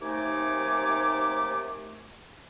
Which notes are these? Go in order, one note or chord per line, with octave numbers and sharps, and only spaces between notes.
D#2 C3 A3 D#4 G#5 D6